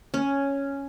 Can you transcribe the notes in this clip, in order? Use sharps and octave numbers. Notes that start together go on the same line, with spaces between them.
C#4